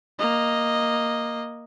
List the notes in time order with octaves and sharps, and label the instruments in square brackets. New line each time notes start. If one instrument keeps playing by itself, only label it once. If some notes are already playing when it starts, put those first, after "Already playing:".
[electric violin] A#3 D#5